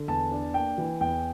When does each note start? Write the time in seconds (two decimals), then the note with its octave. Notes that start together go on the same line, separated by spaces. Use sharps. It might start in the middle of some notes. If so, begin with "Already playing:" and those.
Already playing: D3
0.08 E2 A5
0.32 D4
0.54 A#3 G5
0.78 E3
1.01 E2 G5